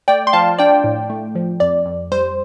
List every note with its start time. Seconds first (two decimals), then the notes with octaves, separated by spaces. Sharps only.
0.08 A3 D5 G5
0.27 C6
0.33 F3 F5 A5
0.59 D4 D5 G5
0.84 A2
1.10 A3
1.35 F3
1.60 F2 D5
1.85 F2
2.12 G3 C5